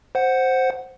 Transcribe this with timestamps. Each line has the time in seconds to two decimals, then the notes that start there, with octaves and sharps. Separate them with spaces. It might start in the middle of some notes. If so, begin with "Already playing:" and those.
0.15 C5 F#5